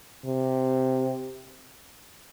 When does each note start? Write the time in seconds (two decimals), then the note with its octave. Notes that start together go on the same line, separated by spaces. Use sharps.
0.25 C3